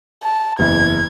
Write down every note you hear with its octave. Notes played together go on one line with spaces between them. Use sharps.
A5
F#1 E2 E4 G#6